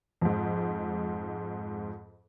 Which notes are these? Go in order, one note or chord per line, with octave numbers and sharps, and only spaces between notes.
F2 G#2